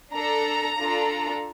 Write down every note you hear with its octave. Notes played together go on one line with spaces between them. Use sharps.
D4 A4 A#5
D4 F4 A4